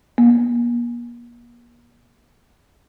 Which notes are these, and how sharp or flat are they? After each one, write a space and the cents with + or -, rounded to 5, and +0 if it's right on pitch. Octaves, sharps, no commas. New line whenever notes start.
A#3 +40